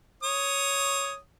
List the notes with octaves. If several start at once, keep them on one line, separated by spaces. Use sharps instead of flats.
C#5 D#6